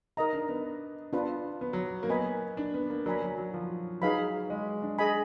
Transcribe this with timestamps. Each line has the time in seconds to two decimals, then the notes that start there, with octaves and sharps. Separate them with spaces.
0.17 D#4 A#4 D#5 A#5
0.33 D4
0.49 B3
1.13 B3 D4 F4 B4
1.61 B3
1.73 F#3
2.03 A#3
2.09 B3 A#4 D#5 G#5 B5
2.57 D4
2.74 B3
2.90 A#3
3.06 F#3 A#4 D5 G#5 B5
3.22 F#3
3.38 F#3
3.54 F3
4.01 F#3 D#4 G#4 B4 F5 B5
4.50 G#3
4.82 D4
4.98 G#4 D#5 G#5 B5